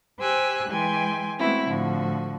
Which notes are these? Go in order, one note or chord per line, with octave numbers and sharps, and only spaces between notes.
G4 C5 G5 G#5 E6 F#6
E3 G#3 G5 G#5 C6
G#3 A3 B3 C4 E4 F#4
A2 D3 F3 F#4